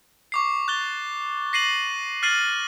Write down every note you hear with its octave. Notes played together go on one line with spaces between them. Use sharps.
C#6 D6 C7
F#6 A6 G7
A#6 C7 D#7 F#7
F6 A6 C7 D#7 F#7